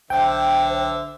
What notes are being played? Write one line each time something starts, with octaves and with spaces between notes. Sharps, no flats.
B1 D3 C5 E5 G5